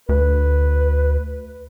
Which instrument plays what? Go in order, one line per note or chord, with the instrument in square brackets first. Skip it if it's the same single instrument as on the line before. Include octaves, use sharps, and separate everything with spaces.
[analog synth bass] D2 [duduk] B4